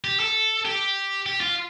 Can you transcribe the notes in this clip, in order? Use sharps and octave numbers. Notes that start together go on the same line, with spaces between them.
G4
A4
G4
G4
F4